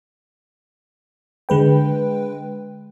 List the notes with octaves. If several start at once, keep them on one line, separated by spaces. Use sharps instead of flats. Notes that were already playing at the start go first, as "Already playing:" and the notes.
D3 G#3 B4 G5